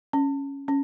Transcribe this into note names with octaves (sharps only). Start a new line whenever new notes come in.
C#4
C#4